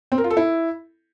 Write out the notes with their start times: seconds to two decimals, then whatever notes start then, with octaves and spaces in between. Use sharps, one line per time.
0.12 C4
0.18 A#4
0.24 F4
0.30 A4
0.37 E4